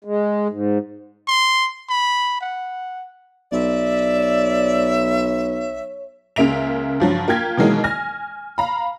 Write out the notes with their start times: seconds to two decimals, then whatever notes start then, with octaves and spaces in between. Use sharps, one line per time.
0.05 G#3
0.49 G#2
1.28 C6
1.89 B5
2.41 F#5
3.52 B1 D5 E5
4.16 C#5
6.36 C#2 C#3 A#3 E5 D7 F7
7.00 G2 F3 F#3
7.28 A#3 F4 G5 F6 G#6 B6
7.57 B2 D#3 E3 F#3 G#3 A#3
7.84 G#5 F6 A#6
8.58 F5 A#5 B5